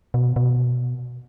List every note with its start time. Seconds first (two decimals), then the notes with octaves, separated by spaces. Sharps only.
0.14 B2
0.36 B2